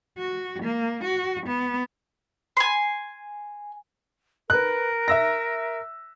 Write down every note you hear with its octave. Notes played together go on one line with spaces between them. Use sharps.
F#4
A#3
F#4
B3
G#5 C6
A#4 B4 F#6
E5 E6 A#6